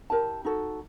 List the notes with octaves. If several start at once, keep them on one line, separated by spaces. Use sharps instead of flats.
E4 G4 A#4 A5
D#4 F#4 A4